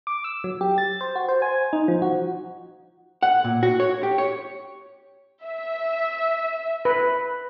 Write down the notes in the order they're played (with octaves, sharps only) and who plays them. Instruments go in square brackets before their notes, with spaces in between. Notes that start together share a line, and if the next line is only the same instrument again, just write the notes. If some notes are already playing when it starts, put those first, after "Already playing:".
[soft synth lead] D6
E6
F#3
G4
A6
C5
F#4
C5
G#5
D#4
F3
F#4
[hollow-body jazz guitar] F#5
A#2
F#4
C#5
G4
C#5
[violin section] E5
[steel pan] B4